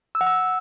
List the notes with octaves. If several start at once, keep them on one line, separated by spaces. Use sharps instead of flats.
E6
F#5
E6